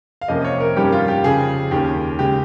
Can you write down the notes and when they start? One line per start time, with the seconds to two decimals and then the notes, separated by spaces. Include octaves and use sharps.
0.21 F5
0.28 F2 C3 F3 A#3 C#4 D#5
0.45 C#5
0.60 A#4
0.76 G2 D#3 G3 C#4 G4
0.92 F4
1.08 G4
1.24 F2 C#3 F3 G#4
1.71 D#2 D#3 A#3 C#4 G4
2.19 C#3 G#3 G4